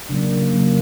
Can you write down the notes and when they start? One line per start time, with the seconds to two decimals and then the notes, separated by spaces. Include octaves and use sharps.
0.09 C#3 F#3 A#3 D4
0.54 C#3 F#3 A#3